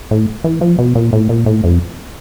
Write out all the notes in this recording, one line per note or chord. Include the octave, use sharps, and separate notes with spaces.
A2
E3
F3
B2
A#2
A2
A#2
A2
F2